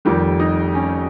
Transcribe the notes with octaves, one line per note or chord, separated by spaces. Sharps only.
F1 F2 D#3 G3 G4
D#4
C#4